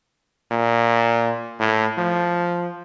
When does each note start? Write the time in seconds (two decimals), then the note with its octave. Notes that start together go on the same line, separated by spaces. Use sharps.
0.51 A#2
1.60 A2
1.98 F3